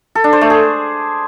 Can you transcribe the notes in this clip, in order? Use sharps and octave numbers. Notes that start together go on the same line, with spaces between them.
A4
D4
C5
A3
G#4